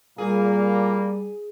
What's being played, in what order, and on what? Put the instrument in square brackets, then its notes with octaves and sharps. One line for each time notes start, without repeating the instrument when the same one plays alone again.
[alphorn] A#2 [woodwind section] G3 [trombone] A#3 [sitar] G#4